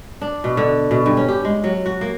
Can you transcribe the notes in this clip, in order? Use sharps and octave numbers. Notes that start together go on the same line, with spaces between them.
D4
B2
D3
B2
G2
C#4
G4
G#3
F#3
F#4
A#3